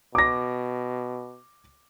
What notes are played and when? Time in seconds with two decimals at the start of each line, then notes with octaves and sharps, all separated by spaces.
0.15 B2 D6 A#6